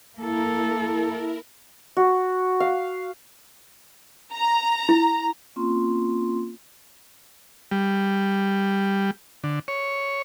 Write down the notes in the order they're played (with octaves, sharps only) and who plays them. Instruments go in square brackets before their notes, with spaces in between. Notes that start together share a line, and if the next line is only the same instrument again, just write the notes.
[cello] A#3 A4 [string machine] E4 A#4
[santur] F#4
F5
[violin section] A#5
[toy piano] E4
[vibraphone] A#3 C4 C#4 F4 C6
[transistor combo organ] G3
D3
C#5